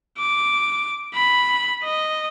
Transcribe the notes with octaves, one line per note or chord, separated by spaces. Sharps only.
D6
B5
D#5